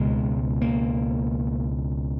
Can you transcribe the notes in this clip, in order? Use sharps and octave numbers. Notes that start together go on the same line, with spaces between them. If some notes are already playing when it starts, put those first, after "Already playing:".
Already playing: C#2 B2 G#3
A#3